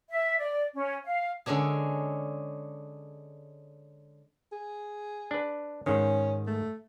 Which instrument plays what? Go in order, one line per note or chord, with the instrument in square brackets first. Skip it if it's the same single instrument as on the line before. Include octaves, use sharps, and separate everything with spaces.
[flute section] E5
D5
C#4
F5
[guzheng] D3 G#3 C#4 D4 G#4
[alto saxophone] G#4
[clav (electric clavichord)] D4 B4
[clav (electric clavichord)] G#2 D#3 [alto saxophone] C#4
[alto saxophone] A3